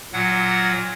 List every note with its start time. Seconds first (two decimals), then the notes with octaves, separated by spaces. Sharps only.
0.13 A#2 F#3 F#5